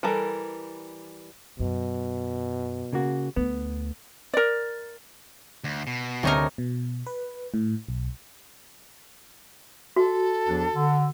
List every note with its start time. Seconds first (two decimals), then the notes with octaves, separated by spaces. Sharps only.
0.03 E3 G3 A4 A#4
1.59 F#2 B2
2.93 C#3 A#3 F#4
3.36 D2 B3
4.34 A#4 D5
5.64 D2
5.87 B2
6.23 D2 C3 D#4 A#4 C#5 D#5
6.58 B2
7.07 B4
7.54 A2
7.88 B1
9.96 F#4 A4
10.48 E2 F3 D4
10.74 D3